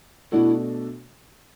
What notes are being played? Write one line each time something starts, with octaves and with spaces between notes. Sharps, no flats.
B2 A3 D4 E4 F#4 A4